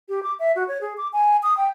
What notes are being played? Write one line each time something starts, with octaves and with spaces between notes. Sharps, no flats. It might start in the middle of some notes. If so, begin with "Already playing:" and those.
G4
D6
E5
F#4
C#5
G#4
D6
G#5
D#6
G5